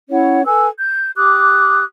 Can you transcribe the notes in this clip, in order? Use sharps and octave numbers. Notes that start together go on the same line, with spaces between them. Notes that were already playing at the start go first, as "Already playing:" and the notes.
C#4 E4 C#5 F#5
A4 B4 G#5 E6
G6
G4 D6 D#6 F#6